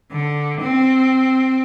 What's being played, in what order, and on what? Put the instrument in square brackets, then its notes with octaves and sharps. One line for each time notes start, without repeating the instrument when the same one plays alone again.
[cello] D3
C4